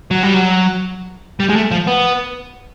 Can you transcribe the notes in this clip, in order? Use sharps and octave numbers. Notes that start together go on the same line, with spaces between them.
F#3
G3
F#3
G3
G#3
A3
F3
B3